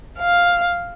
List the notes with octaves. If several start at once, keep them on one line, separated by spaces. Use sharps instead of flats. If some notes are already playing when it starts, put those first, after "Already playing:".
F5